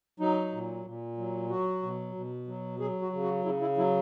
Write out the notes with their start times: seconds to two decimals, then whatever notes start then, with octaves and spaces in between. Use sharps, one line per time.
0.20 F#3 D#4
0.52 A#2
0.85 A#2
1.17 F#3
1.50 F#3 F#4
1.83 B2
2.15 B2
2.48 F#3
2.80 F#3 G#4
3.02 F#4
3.12 C#3
3.23 F#4
3.45 C#3 E4
3.61 E4
3.77 F#3 E4